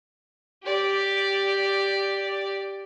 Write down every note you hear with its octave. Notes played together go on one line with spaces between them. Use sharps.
G4 D5